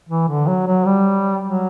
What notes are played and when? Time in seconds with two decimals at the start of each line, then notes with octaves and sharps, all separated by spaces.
0.09 E3
0.28 D3
0.47 F#3
0.67 F#3
0.86 G3
1.44 F#3